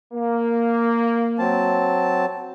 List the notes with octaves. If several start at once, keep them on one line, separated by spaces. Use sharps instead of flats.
A#3
F#3 C4 A5